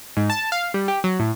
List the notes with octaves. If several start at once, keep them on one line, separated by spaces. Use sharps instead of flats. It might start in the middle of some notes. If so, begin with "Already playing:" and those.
G#2
A5
F5
G3
G4
F#3
A2